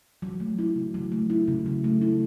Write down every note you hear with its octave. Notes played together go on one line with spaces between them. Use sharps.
F#3
A3
E4
C#3
F#3
A3
E4
C#3
F#3
A3
E4